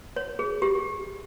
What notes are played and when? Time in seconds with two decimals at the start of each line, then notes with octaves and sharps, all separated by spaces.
0.16 C#5
0.39 G#4
0.62 G4